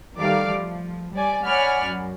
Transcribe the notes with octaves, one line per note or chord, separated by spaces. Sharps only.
D#3 G3 A3 D5 F5 D6
F3
G3 D5 G#5
C#5 D5 F#5 G#5 B5 F6
F#2